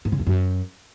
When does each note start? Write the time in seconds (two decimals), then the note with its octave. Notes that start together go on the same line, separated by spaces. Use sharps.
0.05 G#2
0.12 C#3
0.19 E2
0.27 F#2